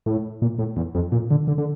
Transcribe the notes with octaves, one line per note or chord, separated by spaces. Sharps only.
A2
A#2
A2
E2
F2
A#2
D3
D3
D3